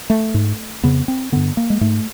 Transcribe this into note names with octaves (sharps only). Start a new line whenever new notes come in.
A3
G#2
F2 C#3 B3
C4
G2 D3 B3
A#3
G#3
G#2 A3